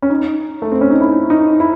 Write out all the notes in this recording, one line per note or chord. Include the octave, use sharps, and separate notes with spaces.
C#4
D#4
A3
C4
C#4
D#4
E4
D#4
E4